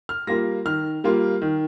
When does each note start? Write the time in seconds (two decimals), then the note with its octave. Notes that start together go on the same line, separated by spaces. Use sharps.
0.09 F6
0.27 G3 A#3 F4 A#6
0.65 D#3 F6
1.04 G3 A#3 F4
1.42 D#3